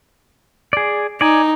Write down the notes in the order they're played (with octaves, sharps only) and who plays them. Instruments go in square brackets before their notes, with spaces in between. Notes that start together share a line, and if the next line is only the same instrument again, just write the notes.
[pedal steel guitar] G#4 D5
[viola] D#4 [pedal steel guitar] D5 G#5